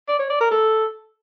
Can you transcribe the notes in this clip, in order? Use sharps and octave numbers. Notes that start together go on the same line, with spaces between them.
D5
C#5
D5
A#4
A4